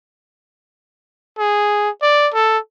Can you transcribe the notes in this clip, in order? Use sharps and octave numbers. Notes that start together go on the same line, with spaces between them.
G#4
D5
A4